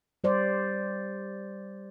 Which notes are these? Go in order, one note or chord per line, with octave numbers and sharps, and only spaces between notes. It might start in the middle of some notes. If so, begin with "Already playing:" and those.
G3 C5 D5